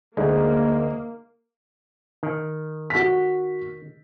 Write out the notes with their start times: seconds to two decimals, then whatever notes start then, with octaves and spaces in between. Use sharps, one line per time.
0.17 D2 G#3 A#3 D#4
2.23 D#3
2.90 F#4 B6